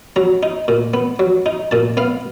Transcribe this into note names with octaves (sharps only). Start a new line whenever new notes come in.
F#3 A#5
D#4
A#2
B3
F#3
D#4
A#2 A5
B3 F5